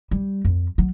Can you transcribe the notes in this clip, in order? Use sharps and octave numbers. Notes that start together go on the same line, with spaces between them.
G3
F2
F#3